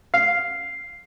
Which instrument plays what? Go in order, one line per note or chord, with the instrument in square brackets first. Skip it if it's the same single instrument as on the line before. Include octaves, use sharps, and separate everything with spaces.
[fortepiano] F5 [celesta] C7